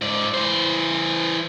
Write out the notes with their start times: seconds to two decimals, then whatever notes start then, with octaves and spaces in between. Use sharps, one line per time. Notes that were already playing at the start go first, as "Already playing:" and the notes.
0.02 G#2 D5
0.34 E3 C5